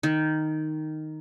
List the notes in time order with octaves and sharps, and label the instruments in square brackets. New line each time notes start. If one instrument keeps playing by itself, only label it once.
[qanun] D#3